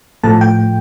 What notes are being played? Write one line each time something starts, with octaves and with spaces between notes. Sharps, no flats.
A2 F3 A3 A5
G5